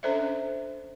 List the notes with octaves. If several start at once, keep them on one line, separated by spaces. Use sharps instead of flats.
C#4 D4 A4 C5 D5 E5